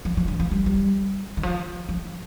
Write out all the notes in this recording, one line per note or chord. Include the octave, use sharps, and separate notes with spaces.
F3
F3
D3
F3
G3
G3
D#3
F3
F3